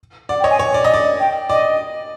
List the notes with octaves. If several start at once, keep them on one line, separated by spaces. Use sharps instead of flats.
D5 F#5
G5
C#5 D#5
G#5
C#5
D5
D#5
D5
G5
D5 D#5